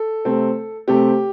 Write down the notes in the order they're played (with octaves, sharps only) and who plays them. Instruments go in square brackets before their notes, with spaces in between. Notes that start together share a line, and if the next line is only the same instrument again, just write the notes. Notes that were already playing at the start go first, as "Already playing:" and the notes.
Already playing: [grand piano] A4
C3 A3 C4
C3 A3 C4 G4